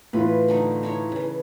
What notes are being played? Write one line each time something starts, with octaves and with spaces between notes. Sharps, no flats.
A2 E3 F4 B4
D3 A3 D#4
D#4 E4 C#5
C#3 E3